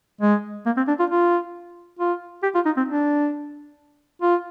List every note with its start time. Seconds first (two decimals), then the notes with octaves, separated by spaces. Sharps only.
0.21 G#3
0.66 A#3
0.77 C4
0.88 D4
0.99 F4
1.10 F4
1.99 F4
2.43 G4
2.55 F4
2.66 D#4
2.77 C4
2.88 D4
4.22 F4